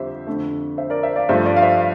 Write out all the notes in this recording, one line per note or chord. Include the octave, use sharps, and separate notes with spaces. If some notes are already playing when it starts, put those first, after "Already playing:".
Already playing: F2 D3 G3 G4 C5 E5
F2 D3 A3
C5 E5
A#4 D5
C5 E5
D5 F5
G2 F3 A3 C5 E5
D5 F5
F5
C5 E5